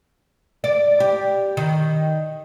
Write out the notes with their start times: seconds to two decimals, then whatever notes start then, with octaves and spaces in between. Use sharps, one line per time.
0.64 D5
1.00 G4
1.57 D#3